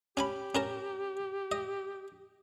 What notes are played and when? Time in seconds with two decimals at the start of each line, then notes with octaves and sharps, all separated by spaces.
0.17 C#4 G4 G#5 B5
0.55 C#4 A#4 A5
1.52 D#5